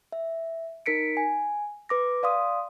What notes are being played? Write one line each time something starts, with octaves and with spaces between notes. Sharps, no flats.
E5
D#4 A#4 B6 C#7 D7
G#5
B4 D6 A#6
D5 F5 C6 D#6